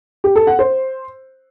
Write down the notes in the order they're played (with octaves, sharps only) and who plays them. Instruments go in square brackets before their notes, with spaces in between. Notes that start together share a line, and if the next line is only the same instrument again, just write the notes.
[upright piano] G4
A4
F#5
C5